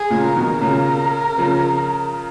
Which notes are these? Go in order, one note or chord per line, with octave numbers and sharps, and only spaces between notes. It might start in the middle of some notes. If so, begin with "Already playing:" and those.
Already playing: G#4
A#2 C#3
A#4
B2 D#3
A#2 C#3 A#4
C#3 F3